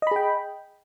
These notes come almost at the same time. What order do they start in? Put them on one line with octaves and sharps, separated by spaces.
D#5 B5 G#4 G5